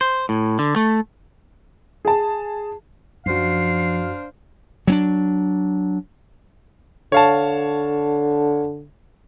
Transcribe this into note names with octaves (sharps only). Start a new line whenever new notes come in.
C5
A2
D3
A3
G#4 A5
F#2 F3 D4 F#4 C5 F5 C7
F#3 C4 D4
D3 C#5 F5 A5